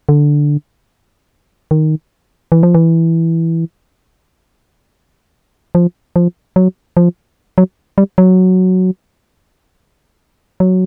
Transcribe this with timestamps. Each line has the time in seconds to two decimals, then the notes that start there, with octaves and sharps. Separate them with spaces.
0.09 D3
1.71 D#3
2.52 E3
2.63 F3
2.75 E3
5.75 F3
6.16 F3
6.56 F#3
6.97 F3
7.58 F#3
7.98 G3
8.18 F#3
10.60 F#3